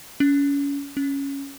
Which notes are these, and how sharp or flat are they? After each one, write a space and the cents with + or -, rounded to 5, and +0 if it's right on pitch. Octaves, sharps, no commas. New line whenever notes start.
C#4 +30
C#4 +0